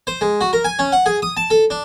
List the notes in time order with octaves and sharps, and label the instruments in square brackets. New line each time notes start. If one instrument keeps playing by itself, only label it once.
[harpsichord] C5
G#3
F#4
A#4
G#5
C#4
F#5
G#4
D#6
A5
A4
D4